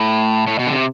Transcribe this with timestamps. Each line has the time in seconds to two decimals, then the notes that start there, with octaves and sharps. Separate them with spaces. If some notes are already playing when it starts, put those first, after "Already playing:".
Already playing: A2
0.47 A2
0.59 B2
0.67 D3
0.72 C3